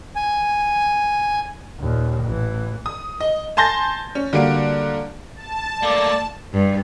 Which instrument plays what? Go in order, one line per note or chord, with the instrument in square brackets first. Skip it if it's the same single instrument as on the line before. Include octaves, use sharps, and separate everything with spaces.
[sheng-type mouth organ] G#5
[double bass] D#2 A#2
A1 E3
[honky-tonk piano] D#6
D#5
G#5 A5 C6 G6 A6 A#6
C#4
D3 G3 A#3 F#4 D7
[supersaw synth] A5
[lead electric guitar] A3 A#3 [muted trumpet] D5
[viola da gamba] G2